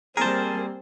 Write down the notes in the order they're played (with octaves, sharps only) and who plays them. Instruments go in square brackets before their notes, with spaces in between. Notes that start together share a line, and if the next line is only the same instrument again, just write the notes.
[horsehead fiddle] G3 A#3 [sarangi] C4 [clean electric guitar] G#4 C5 [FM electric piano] A#4 A5